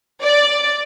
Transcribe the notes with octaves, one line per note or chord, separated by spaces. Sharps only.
D5